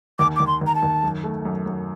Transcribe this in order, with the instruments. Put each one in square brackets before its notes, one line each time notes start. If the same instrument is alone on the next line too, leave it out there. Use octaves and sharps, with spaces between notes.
[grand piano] D#2 [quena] D6
[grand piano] D#2 [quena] D6
[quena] C6
[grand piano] D#2
[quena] A#5
A5
[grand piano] D#2
F#2
A3
F#2
F#2